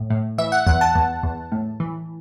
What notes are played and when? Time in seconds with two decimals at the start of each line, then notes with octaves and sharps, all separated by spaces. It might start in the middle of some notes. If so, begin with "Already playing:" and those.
Already playing: A2
0.10 A2
0.38 E3 E5
0.52 F#5
0.67 E2 F#5
0.81 A5
0.95 E2
1.23 E2
1.52 A2
1.80 E3